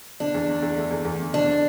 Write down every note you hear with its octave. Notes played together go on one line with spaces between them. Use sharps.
D3 D4
E2
D3
E2
A3
E2
E2
D3
D3 D4
D3